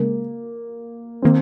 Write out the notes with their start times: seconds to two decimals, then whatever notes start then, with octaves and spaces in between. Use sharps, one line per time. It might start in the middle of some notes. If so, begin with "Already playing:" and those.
Already playing: C#3 G#3 A#3
1.22 D#3 A#3 C4